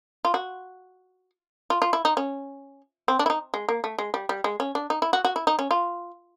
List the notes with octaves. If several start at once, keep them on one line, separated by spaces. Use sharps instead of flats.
F4
F#4
F4
F4
E4
D#4
C#4
C4
D4
E4
D#4
G#3
A#3
A3
G#3
G3
G3
G#3
C#4
D4
D#4
E4
F#4
F#4
E4
D#4
C#4
F4